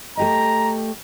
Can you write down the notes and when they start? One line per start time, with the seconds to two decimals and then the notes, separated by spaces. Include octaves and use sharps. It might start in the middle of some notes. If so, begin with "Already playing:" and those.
0.17 A3 G4 D#5 A#5